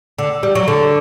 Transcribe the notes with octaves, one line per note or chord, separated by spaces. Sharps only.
D3
G3
F#3
D3